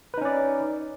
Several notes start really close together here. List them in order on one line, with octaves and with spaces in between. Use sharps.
B4 D#4 C#4 D5